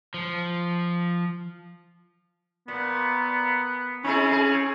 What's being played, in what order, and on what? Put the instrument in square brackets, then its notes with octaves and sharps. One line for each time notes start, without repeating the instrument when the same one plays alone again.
[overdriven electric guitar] F3
[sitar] A#2 [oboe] B3
[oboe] C4 [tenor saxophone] C#4 [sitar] D#4 E4 G#4
[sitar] G#4